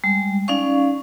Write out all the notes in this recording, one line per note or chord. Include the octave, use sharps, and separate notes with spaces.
G3 G#3
C#4 D#4 D5 F5 C#6